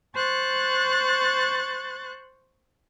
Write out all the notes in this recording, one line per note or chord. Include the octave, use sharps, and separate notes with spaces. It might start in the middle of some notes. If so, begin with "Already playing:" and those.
C5 C#6 F#6 A6